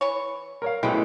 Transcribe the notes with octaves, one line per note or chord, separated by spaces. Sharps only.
E3 C#5
A#4 C#5 F5
G#2 B2 G#3 A3 C#4 E4 G5